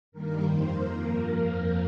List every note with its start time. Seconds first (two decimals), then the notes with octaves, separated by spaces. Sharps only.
0.12 G2 D#3 G3 A#3 A#4
0.43 F2 D#3 A#3 C5
0.73 F2 F3 A#3 A#4
1.05 G2 F3 A#3
1.36 F2 F3 A#3